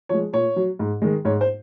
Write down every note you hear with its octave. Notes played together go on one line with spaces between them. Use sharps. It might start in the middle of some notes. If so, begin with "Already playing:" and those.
F3 G#3 C#5
A#2 C#5
F#3
G#2
D#3 G#3
G#2 C#5
C5